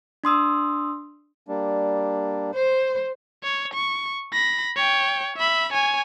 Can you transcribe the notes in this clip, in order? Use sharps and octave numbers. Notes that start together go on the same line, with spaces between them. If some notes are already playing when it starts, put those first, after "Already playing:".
D4 C6 D#6 E6
G3 A#3 D4
C5
C#5
C#6
B5 A#6
C#5 G5
E5 B5
C#5 G#5